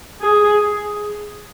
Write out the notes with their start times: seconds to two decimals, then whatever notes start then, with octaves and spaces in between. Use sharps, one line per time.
0.22 G#4